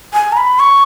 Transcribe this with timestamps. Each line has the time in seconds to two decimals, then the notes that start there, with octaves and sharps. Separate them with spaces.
0.13 G#5
0.32 A#5
0.37 B5
0.59 C#6